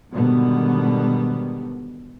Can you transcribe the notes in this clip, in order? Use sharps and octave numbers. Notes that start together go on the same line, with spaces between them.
G#2 B2 D3 D#3 G3 B3